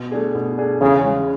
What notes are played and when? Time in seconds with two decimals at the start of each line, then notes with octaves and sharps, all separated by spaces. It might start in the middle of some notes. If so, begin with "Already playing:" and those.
Already playing: B2
0.11 A3 D4 G#4
0.35 B2
0.58 A3 D4 G#4
0.81 E2 C#3
1.04 C#3 G#3 C#4